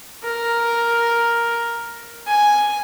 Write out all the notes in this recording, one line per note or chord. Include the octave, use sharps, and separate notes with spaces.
A#4
G#5